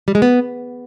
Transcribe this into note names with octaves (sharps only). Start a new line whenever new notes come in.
G3
G#3
B3